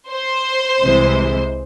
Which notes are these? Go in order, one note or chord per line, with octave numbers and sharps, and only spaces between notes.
C5
C2 C3 E3 G#3